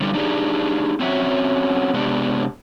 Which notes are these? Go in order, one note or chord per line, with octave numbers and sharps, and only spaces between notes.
D3 G3 E4 A4
D4 D#4 G4 G#4
C4 C#4 F#4 E5
C3 G#3 B3 D4 G4